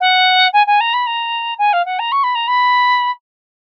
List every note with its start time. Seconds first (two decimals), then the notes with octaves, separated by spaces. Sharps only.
0.01 F#5
0.53 G#5
0.67 G#5
0.80 A#5
0.94 B5
1.07 A#5
1.59 G#5
1.73 F5
1.85 F#5
1.99 A#5
2.12 C#6
2.24 B5
2.35 A#5
2.48 B5